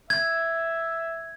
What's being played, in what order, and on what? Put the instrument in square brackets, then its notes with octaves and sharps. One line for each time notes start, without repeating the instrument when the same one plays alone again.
[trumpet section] E5 [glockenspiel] G#6